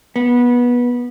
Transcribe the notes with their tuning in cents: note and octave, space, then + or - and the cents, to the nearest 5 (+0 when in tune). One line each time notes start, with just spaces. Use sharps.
B3 -20